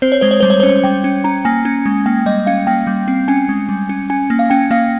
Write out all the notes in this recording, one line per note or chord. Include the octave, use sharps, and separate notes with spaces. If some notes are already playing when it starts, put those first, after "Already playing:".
C4 C5
C#5
G#3 C5
C#5
G3 C5
C#5
C#4 C5
G3 G5
C#4
C#4 A#5
A#3 G#5
C#4
G#3
A#3 G5
G3 D#5
C#4 F5
A#3 G5
G3
C4
C#4 G#5
G#3
G3
C#4
C#4 G#5
A#3
F5
C#4 G5
A#3 F5